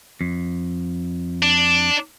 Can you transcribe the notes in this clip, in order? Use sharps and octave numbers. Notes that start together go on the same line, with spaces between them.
F2
D4